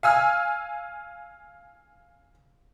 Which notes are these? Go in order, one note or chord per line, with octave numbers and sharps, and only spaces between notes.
F5 G#5 E6 F6